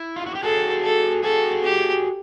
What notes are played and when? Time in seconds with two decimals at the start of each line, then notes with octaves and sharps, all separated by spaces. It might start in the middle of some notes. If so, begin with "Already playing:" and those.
Already playing: E4
0.16 F4
0.26 F#4
0.35 G4
0.43 F#4 G#4 A4
0.84 A4
1.23 F#4 G#4 A4
1.64 G4